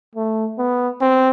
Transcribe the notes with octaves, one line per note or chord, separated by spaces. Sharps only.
A3
B3
C4